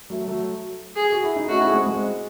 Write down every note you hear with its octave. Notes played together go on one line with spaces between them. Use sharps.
F#3 A3
F#3 A3
G#4
F#4
E4
D#4
A3 C#4 F#4
E4 G#4
G#3 C4
G#3